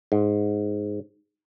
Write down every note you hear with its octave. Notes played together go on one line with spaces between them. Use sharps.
G#2